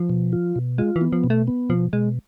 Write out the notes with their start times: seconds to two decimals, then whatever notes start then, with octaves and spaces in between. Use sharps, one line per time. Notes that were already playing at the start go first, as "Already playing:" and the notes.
Already playing: F3
0.10 B2
0.33 F4
0.56 B2
0.78 G#3 F4
0.96 E3
1.01 B3
1.13 F3
1.24 B2
1.30 A3
1.48 B3
1.69 B2 F3
1.93 B2 G#3